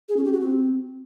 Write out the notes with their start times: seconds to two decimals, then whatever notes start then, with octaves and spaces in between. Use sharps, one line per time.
0.09 G#4
0.17 C#4
0.25 G4
0.33 F#4
0.41 C4